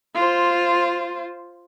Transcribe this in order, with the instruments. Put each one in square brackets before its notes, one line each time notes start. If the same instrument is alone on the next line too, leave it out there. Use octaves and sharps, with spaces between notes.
[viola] F4 C5